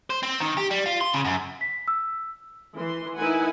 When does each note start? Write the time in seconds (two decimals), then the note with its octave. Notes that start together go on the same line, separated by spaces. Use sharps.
0.10 C5
0.23 C4
0.40 D#3
0.57 G4
0.71 G3
0.86 F4
1.01 C6
1.13 C#3
1.25 F#2
1.61 B6
1.88 E6
2.76 E3 C6
3.17 D#4 E4 A#4 B4 F#5 G#5